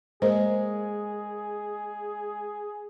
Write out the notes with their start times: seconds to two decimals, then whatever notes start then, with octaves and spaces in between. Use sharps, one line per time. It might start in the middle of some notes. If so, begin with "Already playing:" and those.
0.22 G#3 A#3 G#4 A#4 C5